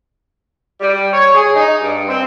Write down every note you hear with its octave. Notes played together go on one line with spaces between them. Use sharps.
G3
C#5
G#4
D#4
G2
C4